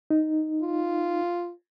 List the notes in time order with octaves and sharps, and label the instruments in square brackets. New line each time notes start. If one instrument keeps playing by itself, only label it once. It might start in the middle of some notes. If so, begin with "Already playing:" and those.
[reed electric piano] D#4
[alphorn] F4